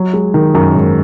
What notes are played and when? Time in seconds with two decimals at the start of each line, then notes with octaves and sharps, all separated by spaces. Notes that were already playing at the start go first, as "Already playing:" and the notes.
Already playing: F#3
0.13 G#3
0.34 D#3
0.55 F#2
0.75 G#2